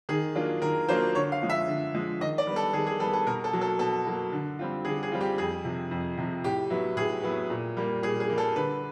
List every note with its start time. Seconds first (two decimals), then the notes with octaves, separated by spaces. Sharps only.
0.09 D#3 G#4
0.35 F#3 A#3 D4 F4
0.62 D#3 A#4
0.88 F#3 A#3 D4 F4 C5
1.15 D3 C#5
1.32 F5
1.42 F3 G#3
1.50 E5
1.68 D3
1.94 F3 G#3
2.21 D#3 D#5
2.38 D5
2.47 G3 B3
2.56 A4
2.73 D#3 G#4
2.87 G#4
3.00 G3 B3 A4
3.13 A4
3.26 B2 A#4
3.44 A4
3.53 F#3 A#3
3.61 A4
3.79 B2 A4
4.06 F#3 A#3
4.32 D3
4.59 G3 C4 F4
4.85 D3 G#4
5.03 G#4
5.12 G3 C4 F4
5.21 G4
5.38 F2 G#4
5.65 C3 F3
5.91 F2
6.18 C3 F3
6.44 A2 G4
6.70 F#3 B3 E4
6.97 A2 G#4
7.23 F#3 B3 E4
7.50 A#2
7.77 G3 A#3
8.03 A#2 G#4
8.20 G#4
8.29 G3 A#3
8.38 A4
8.55 D3 B4